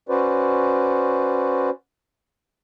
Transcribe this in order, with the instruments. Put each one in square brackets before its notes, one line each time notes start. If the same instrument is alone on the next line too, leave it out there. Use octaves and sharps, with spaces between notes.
[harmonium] C#4 F#4 B4 C5 D5